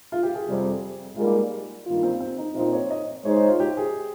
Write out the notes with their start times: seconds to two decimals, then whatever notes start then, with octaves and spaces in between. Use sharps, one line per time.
0.12 F4
0.23 G4
0.34 G#4
0.47 F2 C3 G3
1.16 G#2 G3 A#3 F4
1.85 G2 D#3 A#3 F4
2.03 C4
2.20 C4
2.38 D#4
2.55 A#2 F3 C4 D#4 F4
2.73 C#5
2.91 D#5
3.25 G#3 D#4 G#4 C5 C#5
3.36 C#5
3.48 F4
3.60 G4
3.77 G#4